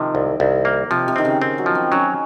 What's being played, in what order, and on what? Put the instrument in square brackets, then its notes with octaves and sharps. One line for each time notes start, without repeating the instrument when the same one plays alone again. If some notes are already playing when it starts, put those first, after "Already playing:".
Already playing: [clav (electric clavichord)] C3 F3 [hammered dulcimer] D#3
[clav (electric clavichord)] C2
C2
A#3
[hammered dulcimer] C3 [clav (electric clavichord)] F3
[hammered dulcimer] C3
[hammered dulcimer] D#3 [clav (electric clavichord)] C4
[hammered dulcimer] C#3
[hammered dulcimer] D#3 [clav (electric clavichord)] C4
[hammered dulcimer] F#3
[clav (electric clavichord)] F3
[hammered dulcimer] C4
[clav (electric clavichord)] F#3 [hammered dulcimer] C#4